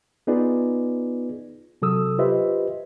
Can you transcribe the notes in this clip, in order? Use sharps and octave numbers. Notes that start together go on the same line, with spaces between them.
B3 D#4 F4 G#4 B4 D5
C3 F#3 A4 D#6 E6
F4 G4 B4 C5 D#5 E5